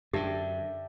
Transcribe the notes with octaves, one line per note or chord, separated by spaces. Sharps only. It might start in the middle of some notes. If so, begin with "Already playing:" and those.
F#2 D3 D4 G4 E5 G5